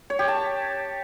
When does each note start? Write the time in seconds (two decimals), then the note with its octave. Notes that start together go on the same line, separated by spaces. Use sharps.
0.10 C#5
0.19 G4
0.28 A5